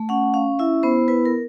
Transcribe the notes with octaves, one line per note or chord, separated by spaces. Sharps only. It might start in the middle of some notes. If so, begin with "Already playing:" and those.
Already playing: A3
C#4 F#5
C#4 F5
E4 E5
B3 C5
E4 B4
A#4